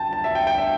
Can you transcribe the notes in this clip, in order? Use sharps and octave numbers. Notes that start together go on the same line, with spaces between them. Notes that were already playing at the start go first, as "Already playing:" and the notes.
Already playing: G5 A5
A5
E5
G5
G5
E5